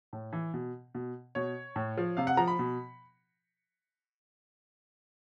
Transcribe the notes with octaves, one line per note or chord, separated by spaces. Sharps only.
A2
E3
B2
B2
B2 C#5
A2
F3
C3 F5
F#5
F3 A#5
B5
B2